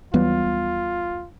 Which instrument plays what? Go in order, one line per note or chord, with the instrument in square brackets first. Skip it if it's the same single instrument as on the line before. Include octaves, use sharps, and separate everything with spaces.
[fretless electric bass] D#2 E3 F#3 [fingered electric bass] G3 B3 [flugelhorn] F4